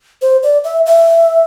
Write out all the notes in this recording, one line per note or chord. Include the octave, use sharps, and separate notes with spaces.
C5
D5
E5
E5